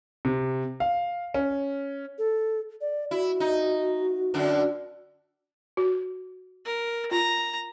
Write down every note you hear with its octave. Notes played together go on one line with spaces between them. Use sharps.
C3
F5
C#4
A4
D5
E4 F#4
D#4
F#2 D3 D4
F#4
A#4
F4 A#5